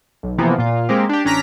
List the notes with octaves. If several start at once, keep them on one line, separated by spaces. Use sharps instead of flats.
B1
C3 E3 F3 A#3 B3
A#2 F4
G#3 A#3 C4 G4
D4 G4
A1 C#4 D4 A#5 A#6 B6